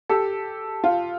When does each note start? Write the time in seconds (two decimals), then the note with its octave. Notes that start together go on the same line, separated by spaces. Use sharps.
0.09 G4 A4
0.84 F4